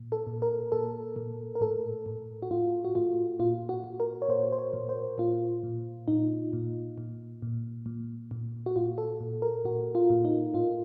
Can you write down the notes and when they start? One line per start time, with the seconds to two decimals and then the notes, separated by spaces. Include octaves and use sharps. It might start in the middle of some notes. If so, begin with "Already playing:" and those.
Already playing: A#2
0.12 A4
0.27 A#2
0.42 A#4
0.72 A#2 A4
1.16 A#2
1.55 A#4
1.61 A2 A4
2.06 A2
2.42 F#4
2.51 A2 F4
2.85 F#4
2.95 A2 F4
3.39 A#2 F4
3.69 F#4
3.84 A#2
4.00 A#4
4.22 C#5
4.29 A#2 C5
4.52 C5
4.59 C#5
4.73 A#2
4.89 C5
5.18 A#2 F4
5.63 A#2
6.08 A#2 D#4
6.53 A#2
6.98 A#2
7.42 A#2
7.86 A#2
8.31 A#2
8.66 F#4
8.76 A#2 F4
8.98 A4
9.20 A#2
9.42 A#4
9.65 A#2 F#4
9.95 F4
10.10 A#2
10.25 D#4
10.54 A2 F4